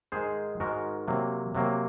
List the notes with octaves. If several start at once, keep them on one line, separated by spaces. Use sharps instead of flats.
G#2 D#3 G#3 G#4 C5
G#2 D#3 G#3 F#4 A#4
C3 F#3 A#3
C3 F#3 A#3